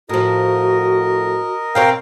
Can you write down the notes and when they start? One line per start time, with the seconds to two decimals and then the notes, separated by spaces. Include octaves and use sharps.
0.09 A2 F3 F#4 A#4 D#5
1.75 B2 C4 A#4 C#5 F5 G5